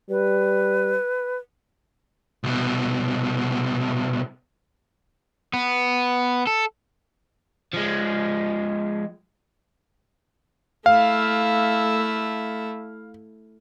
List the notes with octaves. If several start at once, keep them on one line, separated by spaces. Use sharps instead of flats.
G3 B4
C2 B2
B3
A4
F3 G#3
A3 E4 F5